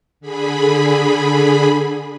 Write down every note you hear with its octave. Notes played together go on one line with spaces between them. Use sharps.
D3 G#4 B5